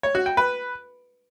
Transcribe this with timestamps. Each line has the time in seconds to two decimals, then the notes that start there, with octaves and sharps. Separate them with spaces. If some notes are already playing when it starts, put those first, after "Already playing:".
0.03 C#5
0.15 F#4
0.26 G5
0.37 B4